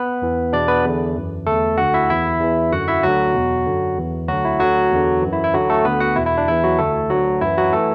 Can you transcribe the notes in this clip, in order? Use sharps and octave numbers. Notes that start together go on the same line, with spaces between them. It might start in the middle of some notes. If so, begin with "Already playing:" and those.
Already playing: B3 B4
E2 E3
E2 B2 D4 D5
B3 B4
E2 D3
F#2 E3
E2 D3 A3 A4
D2 D3 F#4 F#5
E4 E5
E2 E3 E4 E5
E2 E3
F#2 D3 F#4 F#5
E4 E5
D2 D3 F#3 F#4
E2 B2
F#2 D3
E2 E3
D2 D3 F#3 F#4
E4
D2 D3 F#3 F#4
E2 D3
F#2 E3
E4
E4
D2 D3 F#3 F#4
A3 A4
D2 D3 B3 B4
F#4 F#5
E2 B2 E4
E4
D4
E2 E3 E4
F#3 F#4
D2 D3 A3 A4
D2 D3 F#3 F#4
F#2 E3 E4
F#3 F#4
E3 A3 A4